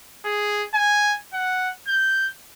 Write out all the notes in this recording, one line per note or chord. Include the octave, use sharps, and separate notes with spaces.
G#4
G#5
F#5
G6